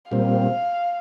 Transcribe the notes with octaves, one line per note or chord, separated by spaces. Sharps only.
A#2 G3 C4 F5